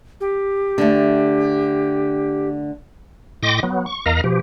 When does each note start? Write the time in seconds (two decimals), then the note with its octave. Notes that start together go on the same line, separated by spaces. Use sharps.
0.21 G4
0.78 D3 A3
3.43 A2 D#5 G5 C6 D6 A#6
3.63 F#3 B3
3.86 C#6
4.06 E2 A#4 D#5 F5 A#5
4.24 B2 F3 G4